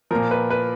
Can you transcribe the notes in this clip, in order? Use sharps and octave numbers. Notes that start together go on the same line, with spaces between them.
A#2 F3 A#4
B4
B4